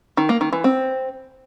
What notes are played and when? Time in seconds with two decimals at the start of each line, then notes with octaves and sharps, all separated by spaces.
0.17 D#3
0.29 A#3
0.41 D#3
0.53 E3
0.64 C4